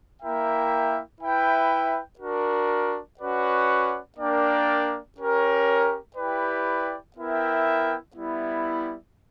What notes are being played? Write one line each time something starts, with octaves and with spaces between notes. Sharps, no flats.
A#3 E4 A#4 E5 G5
E4 B4 E5 G5
D4 F#4 A#4
C#4 F#4 B4 D5 F#5
A#3 D4 A#4 D5 G5
C#4 G4 A#4 C#5
E4 G4 B4 D5 G5
B3 E4 A#4 E5 G5
G3 B3 E4